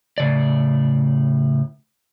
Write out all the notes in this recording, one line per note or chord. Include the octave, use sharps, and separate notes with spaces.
A2 C#3 D5